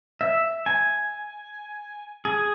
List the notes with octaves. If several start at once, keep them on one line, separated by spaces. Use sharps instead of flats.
E5
G#5
G#4